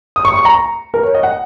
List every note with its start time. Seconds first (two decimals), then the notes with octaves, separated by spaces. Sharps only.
0.16 D#6
0.25 C#6
0.36 C#6
0.45 A#5
0.94 A#4
1.04 C#5
1.15 D#5
1.23 F#5